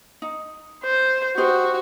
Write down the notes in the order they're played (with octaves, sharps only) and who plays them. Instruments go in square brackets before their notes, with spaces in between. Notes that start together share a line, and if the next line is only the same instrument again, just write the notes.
[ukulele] D#4
[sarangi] C5
[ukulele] D#4 G4 C5 [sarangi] F#4